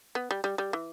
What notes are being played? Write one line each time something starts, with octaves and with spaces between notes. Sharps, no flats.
B3
G3
G3
G3
E3